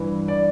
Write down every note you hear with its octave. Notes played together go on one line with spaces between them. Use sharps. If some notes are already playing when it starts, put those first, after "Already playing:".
Already playing: G2 E3
D5